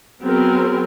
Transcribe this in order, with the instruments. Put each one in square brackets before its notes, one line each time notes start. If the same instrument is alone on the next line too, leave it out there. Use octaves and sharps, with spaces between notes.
[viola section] F#3 B3 C4 G#4 A#4